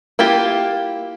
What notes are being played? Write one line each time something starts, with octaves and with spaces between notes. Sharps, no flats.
A#3 E4 F4 G4